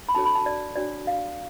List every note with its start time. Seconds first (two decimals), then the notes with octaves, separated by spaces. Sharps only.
0.09 B5
0.15 D4 F#4 A4 C#5 A5
0.26 B5
0.35 A5
0.46 D5
0.75 D4 F#4 C#5 D5
1.07 F5